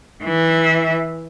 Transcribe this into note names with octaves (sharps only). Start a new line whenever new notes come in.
E3 E5